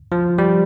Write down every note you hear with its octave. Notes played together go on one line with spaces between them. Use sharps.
F3
G3